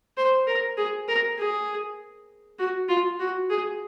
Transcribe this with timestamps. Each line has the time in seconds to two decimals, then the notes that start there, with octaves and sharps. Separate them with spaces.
0.17 C5
0.47 A#4
0.77 G#4
1.08 A#4
1.38 G#4
2.59 F#4
2.89 F4
3.19 F#4
3.50 G#4